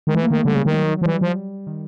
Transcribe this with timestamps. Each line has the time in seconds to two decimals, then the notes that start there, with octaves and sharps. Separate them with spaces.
0.07 D#3 G#3
0.15 E3 A3
0.23 A#3
0.30 D#3 A3
0.38 G#3
0.45 D3 G3
0.55 C#3
0.65 D#3
0.76 F#3
0.98 F#3
1.02 F3
1.05 E3 G3
1.21 F3
1.67 D#3